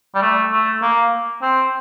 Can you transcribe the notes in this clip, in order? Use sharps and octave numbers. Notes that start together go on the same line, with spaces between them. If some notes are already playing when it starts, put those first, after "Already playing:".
G3
A3
A3
A#3
C4